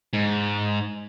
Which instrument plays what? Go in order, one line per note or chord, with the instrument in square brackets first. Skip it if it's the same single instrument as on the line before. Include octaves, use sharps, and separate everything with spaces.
[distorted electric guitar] G#2